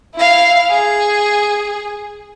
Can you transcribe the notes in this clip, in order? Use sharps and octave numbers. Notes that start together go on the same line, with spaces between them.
E4 F5
G#4